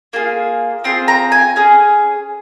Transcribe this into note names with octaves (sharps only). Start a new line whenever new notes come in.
A#3 F4 G#4
C4 F4 G#4 C6
A#5
G#5
C#4 G#4